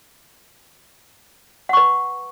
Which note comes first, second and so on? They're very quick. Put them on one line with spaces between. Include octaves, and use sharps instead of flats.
F#5 C#6 B4